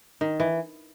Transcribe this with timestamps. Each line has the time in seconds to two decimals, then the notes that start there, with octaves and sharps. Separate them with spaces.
0.21 D#3
0.40 E3